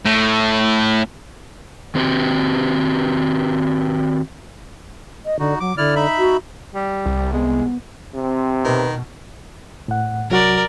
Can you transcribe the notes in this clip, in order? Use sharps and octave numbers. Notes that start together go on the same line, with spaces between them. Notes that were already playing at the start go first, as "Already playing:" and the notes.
A2
D#3 C4 F#4 G4
D#5
D3 D#4 F#4
F#3 D6
D3 E4 D5 F6
D#4 E5 B5
F#4
G3
C2
G#3 B3
C3 C4
B2 D#3 B4
A2 F#5
C2 F#3 F#4 A#4 D5